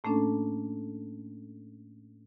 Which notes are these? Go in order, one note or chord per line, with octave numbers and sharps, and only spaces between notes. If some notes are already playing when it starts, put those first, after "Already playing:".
A2 A3 A#3 C#4 D4 A4